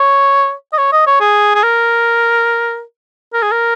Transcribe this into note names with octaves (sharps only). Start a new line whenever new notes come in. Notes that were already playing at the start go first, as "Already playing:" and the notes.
Already playing: C#5
D#5
C#5
D#5
C#5
G#4
G#4
A#4
A#4
G#4
A#4